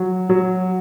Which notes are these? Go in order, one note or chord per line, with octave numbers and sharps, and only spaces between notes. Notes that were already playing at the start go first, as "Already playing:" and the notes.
Already playing: F#3
F#3